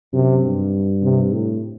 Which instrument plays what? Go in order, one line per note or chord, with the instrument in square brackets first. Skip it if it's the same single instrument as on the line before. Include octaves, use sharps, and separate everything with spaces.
[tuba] F#2 [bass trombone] C3
[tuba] G2
[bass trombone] C3
[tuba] A2